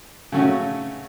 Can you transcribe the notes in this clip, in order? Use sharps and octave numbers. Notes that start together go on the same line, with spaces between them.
C#3 F#3 A3 C#4 F#4